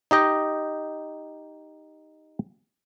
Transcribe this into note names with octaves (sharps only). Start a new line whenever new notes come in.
D#4 G4 D#5 G5